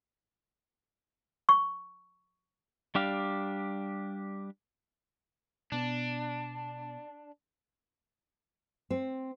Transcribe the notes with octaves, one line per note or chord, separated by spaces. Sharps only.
C#6
G3 D4 G4 F5
B2 B3 D4
C4